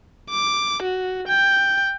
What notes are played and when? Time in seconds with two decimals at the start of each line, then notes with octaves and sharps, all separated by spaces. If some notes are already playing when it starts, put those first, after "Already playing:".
0.30 D6
0.83 F#4
1.28 G5